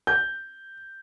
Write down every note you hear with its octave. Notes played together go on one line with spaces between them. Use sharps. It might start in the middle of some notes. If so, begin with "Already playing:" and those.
G6